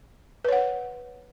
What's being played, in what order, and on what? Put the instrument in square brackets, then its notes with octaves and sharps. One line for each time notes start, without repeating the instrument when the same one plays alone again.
[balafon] B4
C#5
F#5